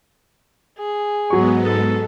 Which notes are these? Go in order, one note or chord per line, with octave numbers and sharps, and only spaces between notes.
G#4
G#2 F#3 G#3 B3 C#6
A4